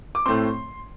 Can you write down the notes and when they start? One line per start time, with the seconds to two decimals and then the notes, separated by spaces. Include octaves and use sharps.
0.15 D6
0.26 A2 A3 C4 C6